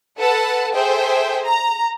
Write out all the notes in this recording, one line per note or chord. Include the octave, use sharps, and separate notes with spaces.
A4 B4 F#5 A5
G#4 A4 C5 E5 G5
A#5